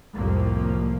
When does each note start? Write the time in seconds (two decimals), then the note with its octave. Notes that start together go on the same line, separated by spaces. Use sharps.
0.16 C2 F2 A2 F3 A#3